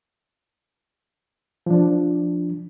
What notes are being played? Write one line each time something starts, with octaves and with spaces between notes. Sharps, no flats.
F3 D4